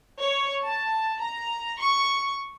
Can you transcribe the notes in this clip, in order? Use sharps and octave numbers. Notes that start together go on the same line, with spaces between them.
C#5
A5
A#5
C#6